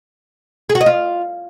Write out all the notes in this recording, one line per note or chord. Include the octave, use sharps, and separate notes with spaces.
G#4
F#4
D#5
F4